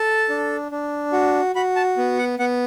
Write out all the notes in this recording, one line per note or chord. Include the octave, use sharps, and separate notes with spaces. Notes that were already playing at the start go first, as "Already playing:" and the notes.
Already playing: A4 A5
D4
D4
F#4
F#4 B5
A5
B3
F#5
B3 F#5